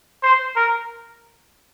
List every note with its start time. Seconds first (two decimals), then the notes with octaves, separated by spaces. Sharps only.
0.23 C5
0.56 A#4